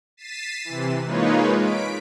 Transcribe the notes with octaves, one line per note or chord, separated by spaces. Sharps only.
A6 B6 C7 D#7 E7
C3 E3
G#3 A#3 D#4 F4 B4 C#5
B6 D7